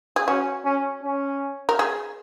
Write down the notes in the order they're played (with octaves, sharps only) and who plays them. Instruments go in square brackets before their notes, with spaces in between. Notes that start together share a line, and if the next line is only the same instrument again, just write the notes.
[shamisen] G#4
[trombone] C#4 [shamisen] F#4
[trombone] C#4
C#4
[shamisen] A#4
G#4